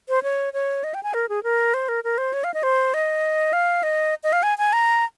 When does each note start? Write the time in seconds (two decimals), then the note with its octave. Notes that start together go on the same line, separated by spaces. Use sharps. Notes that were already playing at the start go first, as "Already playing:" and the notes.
0.09 C5
0.23 C#5
0.53 C#5
0.84 D#5
0.94 G5
1.03 G#5
1.14 A#4
1.29 G#4
1.43 A#4
1.74 C5
1.89 A#4
2.04 A#4
2.18 C5
2.33 C#5
2.44 F5
2.54 D#5
2.63 C5
2.94 D#5
3.53 F5
3.83 D#5
4.23 D#5
4.33 F5
4.43 G#5
4.58 G#5
4.73 A#5